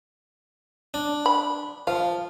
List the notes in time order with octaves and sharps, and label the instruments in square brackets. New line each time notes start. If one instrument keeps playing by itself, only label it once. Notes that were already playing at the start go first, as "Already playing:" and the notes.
[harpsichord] D4
[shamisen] B5
[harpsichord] F3 [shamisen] F5